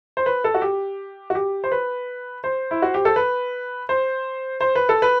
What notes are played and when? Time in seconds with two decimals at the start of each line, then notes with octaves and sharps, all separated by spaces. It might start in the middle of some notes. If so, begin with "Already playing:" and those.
0.17 C5
0.26 B4
0.44 A4
0.54 F#4
0.62 G4
1.30 F#4
1.35 G4
1.64 C5
1.72 B4
2.44 C5
2.71 E4
2.82 F#4
2.94 G4
3.05 A4
3.16 B4
3.89 C5
4.61 C5
4.75 B4
4.89 A4
5.02 B4